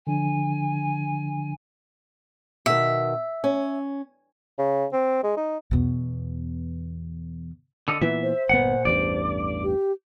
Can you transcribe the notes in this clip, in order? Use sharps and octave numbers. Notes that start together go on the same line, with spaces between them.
D3 F3 D4 G#5
B2 D#3 E5
C#4
C#3
C4
G#3
D#4
E2 B2
D3 A4 D#5
A#2 E3 B3 E5
C5
G1 A#2 B3 F#5
A1 E2 G2 D5
G4